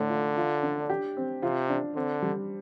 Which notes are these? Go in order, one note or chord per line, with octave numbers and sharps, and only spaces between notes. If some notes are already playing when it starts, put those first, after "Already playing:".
Already playing: A2 D3
F4
F4
D4
G4
C4
C3 F4
D4
D3 C4
G3